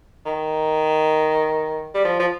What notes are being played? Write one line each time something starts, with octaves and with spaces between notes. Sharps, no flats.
D#3
G3
F3
F3